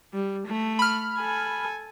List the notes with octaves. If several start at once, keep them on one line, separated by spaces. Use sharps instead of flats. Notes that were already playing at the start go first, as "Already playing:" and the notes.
G3
A3
B5 F6
A4 G#5